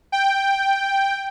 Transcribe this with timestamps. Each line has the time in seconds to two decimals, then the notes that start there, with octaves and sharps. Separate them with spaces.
0.12 G5